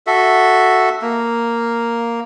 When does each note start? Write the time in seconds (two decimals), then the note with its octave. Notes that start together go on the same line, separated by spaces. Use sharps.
0.07 F#4 A4 E5
1.02 A#3